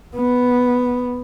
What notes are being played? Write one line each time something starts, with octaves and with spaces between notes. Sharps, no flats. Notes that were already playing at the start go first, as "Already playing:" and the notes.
B3